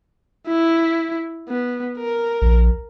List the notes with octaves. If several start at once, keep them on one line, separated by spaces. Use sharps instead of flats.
E4
B3
A#4
A#1